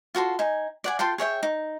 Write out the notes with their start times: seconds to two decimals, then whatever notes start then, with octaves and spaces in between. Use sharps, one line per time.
0.15 F4 F#4 A4 C6
0.39 D#4 G#5
0.84 D5 F#5 G#5
0.99 F4 A4 G5 C6
1.18 G#4 C#5 E5 G5
1.43 D#4